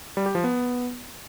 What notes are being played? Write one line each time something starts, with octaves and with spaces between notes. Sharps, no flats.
G3
G4
F3
B3